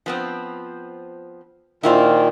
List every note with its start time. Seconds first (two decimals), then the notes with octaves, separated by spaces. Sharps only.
0.06 F3 B3 C4
1.83 A#2 D#3 E4 F4 C5